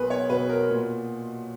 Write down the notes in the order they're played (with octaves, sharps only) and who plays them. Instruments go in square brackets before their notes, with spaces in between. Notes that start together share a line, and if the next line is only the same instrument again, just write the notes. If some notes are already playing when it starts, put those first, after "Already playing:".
Already playing: [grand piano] B1 B3 G#4 A#4 B4
C#5
B2 B4
A#4
A#2